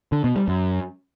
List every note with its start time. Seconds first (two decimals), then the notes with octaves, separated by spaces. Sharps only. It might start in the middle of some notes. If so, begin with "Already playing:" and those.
0.12 D3
0.24 B2
0.36 G3
0.48 F#2